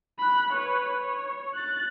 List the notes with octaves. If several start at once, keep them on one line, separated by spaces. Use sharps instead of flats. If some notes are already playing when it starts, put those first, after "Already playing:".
B5 F#6
B4 C#5
C#5
F#6 A6